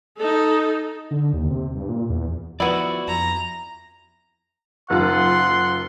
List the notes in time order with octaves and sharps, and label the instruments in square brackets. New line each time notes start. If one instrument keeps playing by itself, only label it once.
[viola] D#4 A4
[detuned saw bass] D3
D#2
C3
G2
A#2
E2
[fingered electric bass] F3 [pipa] B3 E4 [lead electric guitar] F#4 D5
[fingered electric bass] F2 [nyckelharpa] A#5
[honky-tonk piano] F#1 D#3 F4 [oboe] F#5 [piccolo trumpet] C6